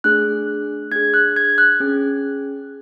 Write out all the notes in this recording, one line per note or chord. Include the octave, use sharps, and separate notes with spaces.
A3 D4 G#4 F#6
D4 G#4 G#6
F#6
G#6
F#6
C#4 G#4